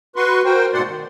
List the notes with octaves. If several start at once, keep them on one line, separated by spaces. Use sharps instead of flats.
F#4 B4 C6 C#6
F#4 A#4 C5 G5
G#2 B2 A3 D5 F#5 C6
D#3